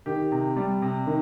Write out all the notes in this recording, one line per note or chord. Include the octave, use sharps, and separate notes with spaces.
D#3 G4
C3
G3
C3
D#3